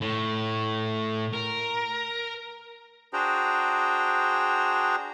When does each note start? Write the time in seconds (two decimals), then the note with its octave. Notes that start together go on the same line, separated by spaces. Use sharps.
0.01 A2
1.34 A#4
3.13 D4 F#4 G#4 C5 G5 A#5